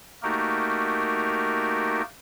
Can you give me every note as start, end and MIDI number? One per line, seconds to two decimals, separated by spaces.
0.23 2.02 57
0.23 2.02 58
0.23 2.02 63
0.23 2.02 66
0.23 2.02 67
0.23 2.02 70